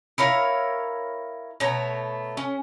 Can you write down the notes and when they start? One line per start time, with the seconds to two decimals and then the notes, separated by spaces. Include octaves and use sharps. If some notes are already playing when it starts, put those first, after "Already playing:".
0.18 E4 A#4 C#5 F5
1.60 B2 A3 C#5 A#5
2.37 C#4